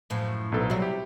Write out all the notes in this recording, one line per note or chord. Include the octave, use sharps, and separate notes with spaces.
F#2 A2 F3
B1 A4 B4
C3 F#3 G3 E4
G4